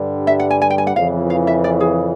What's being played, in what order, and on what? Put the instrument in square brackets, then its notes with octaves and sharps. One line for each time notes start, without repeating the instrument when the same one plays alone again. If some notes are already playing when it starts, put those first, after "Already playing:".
Already playing: [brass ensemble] G2 D3 G3
[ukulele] E5
F#5
G#5
G#5
G5
G#5
F#5
[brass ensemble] F2 C#3 E3 [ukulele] F5
[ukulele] F5
E5
D5
G#4